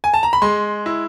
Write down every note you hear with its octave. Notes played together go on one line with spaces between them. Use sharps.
G#5
A5
A#5
B5
G#3 C6
E4